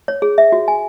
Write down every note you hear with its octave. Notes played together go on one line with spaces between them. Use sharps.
C#5
G#4
E5
F#4
G#5